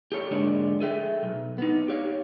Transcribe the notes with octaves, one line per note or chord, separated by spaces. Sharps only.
G4 A4 C#5
G#2 D3 F3 G#3 A#3 D4
G#4 A4 E5 G5
B1
B3 D#4
G4 C#5 F5